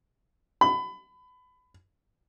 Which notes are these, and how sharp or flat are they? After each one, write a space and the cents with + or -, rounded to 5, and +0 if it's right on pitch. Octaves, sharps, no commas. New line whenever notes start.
B5 +25